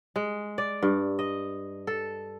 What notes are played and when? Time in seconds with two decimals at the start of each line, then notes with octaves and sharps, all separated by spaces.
0.16 G#3
0.58 D5
0.82 G2
1.19 D#5
1.87 A4